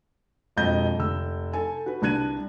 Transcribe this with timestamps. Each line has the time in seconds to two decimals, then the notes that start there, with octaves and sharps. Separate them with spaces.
0.56 E1 F2 D#5 G6
0.99 F1 E6
1.53 A4 G#5
1.86 F#4 B4
2.02 C2 D4 F#6 G#6 D#7